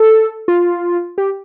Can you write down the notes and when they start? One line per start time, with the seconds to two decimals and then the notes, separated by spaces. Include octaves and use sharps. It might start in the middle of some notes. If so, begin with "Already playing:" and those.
Already playing: A4
0.48 F4
1.18 G4